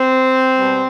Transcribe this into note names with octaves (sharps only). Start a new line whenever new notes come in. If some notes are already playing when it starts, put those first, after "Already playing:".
Already playing: C4
B2 G3 B3